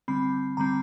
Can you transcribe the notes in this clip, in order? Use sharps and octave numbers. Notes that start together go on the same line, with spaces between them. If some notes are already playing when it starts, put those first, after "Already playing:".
D3 G3 C4 B5
D3 G3 C4 A#5